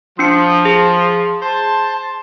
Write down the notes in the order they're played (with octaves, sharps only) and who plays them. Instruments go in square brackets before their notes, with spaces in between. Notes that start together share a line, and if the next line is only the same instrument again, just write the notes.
[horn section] F3 [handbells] D4 C#7
[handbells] G#4
[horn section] C5 A5